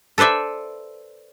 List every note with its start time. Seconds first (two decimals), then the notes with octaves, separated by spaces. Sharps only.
0.18 A4 B4 C5 D5 E5